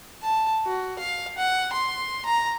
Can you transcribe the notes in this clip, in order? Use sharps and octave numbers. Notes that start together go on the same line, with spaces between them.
A5
F#4
F5
F#5
C6
A#5